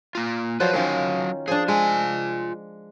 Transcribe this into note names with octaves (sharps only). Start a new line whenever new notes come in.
A#3 F4
F3 F#3 F4 B4 D5
D#3 F#3 C#4 A#4 F5
F3 D4 G#4
G#3 F4 G#5